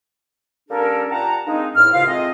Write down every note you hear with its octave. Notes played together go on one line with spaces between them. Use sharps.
G3 A#3 C#4 D4 A4 A#4
A#2 G4 F#5 A5 A#5
G#3 A#3 C4 D4 D#4
E2 A2 F6
D#2 G#2 C#3 F4 F5
G#3 A3 C4 F4 D#5